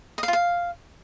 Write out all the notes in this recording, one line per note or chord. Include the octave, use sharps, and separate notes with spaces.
D#5
F5
F4
F5